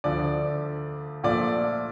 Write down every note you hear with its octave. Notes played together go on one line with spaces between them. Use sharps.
D2 D3 F3 D5
A#2 F3 A3 D5